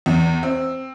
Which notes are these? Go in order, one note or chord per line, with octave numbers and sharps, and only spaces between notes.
E2
C4